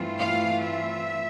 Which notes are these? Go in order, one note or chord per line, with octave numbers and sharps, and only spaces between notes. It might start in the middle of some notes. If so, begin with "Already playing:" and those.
Already playing: G2 E3 A3 C4 F4
F5
E5